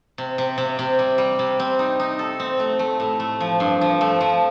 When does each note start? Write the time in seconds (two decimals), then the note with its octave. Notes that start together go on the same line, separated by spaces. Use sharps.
0.18 C3
0.38 C3
0.58 C3
0.79 C3
0.99 G3
1.18 G3
1.39 C3
1.59 C4
1.79 D#4
2.00 D#4
2.19 A4
2.40 C4
2.59 A3
2.79 A3
3.00 A2
3.20 A3
3.40 F3
3.60 G2
3.81 F3
4.01 A3
4.21 F3